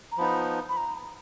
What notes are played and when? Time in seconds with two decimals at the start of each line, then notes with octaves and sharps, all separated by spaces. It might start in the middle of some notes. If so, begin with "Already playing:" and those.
0.12 A#5
0.18 F3 B3 D#4 B5
0.69 B5
0.77 A#5